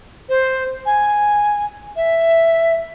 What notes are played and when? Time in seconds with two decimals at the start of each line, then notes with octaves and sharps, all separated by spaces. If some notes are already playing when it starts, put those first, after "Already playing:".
0.29 C5
0.86 G#5
1.97 E5